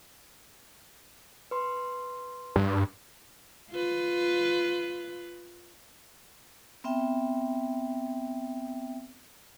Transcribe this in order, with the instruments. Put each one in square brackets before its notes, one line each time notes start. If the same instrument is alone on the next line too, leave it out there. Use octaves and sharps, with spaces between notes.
[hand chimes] B4 C6
[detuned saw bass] G2
[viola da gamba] F4 B4
[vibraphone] B3 C4 E5 G5